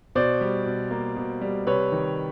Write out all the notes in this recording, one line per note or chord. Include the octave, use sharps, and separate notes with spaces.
B2 C5 D5
G3
B2
A#3
B2
G3
C3 B4 C#5
D#3